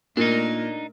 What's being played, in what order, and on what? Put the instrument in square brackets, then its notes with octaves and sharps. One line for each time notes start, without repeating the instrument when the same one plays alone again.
[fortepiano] A#2 [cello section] A3 A#4 [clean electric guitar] D4 D#4